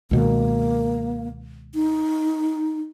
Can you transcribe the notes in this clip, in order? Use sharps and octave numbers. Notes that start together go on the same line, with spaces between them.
C#2 B2 D#3 A#3
D#4